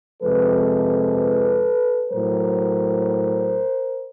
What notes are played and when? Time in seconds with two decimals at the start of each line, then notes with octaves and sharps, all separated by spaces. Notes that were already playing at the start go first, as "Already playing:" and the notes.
0.22 F2 C3 F3 G#3 A4 B4
2.12 A2 F#3 A#4 C5